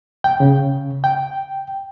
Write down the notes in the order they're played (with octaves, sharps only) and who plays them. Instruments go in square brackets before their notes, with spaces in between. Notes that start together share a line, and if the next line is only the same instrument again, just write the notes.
[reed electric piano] G5
C#3
G5